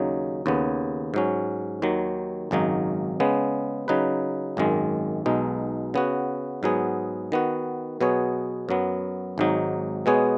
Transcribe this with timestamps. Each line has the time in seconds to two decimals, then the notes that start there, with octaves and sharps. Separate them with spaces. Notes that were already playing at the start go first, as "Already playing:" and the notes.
Already playing: D#2 C#3 F#3 D#4
0.46 D#2 C#3 B3
1.14 G#2 F#3 C#4
1.82 D#2 D#3 F#3
2.51 G#1 F#2 C#3 F#3 D#4
3.20 C#3 G#3 B3
3.88 C#3 F#3 D#4 B4
4.57 G#1 F#2 D#3 G#3
5.26 B1 B2 G#3 D#4
5.94 C#3 B3 F#4
6.63 G#2 F#3 B3 G#4
7.32 D#3 B3 F#4
8.01 B2 F#3 B3 G#4 C#5
8.69 F#2 F#3 B3
9.38 G#1 G#2 F#3 D#4
10.06 B2 G#3 B3 G#4 C#5